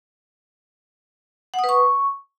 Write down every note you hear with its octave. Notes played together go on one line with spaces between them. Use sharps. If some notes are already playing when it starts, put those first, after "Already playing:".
F#5
D#6
B4
C#6